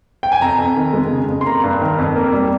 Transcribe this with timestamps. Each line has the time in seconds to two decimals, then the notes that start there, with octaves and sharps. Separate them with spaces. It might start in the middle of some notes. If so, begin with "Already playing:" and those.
0.23 G5
0.32 G#5
0.41 F2 A#5
0.58 F2
0.77 D#3
0.93 G#3
1.11 C#3
1.28 F2
1.41 C6
1.46 A#3 A#5
1.63 G2
1.81 D#3
1.98 F2
2.16 A#3
2.33 G3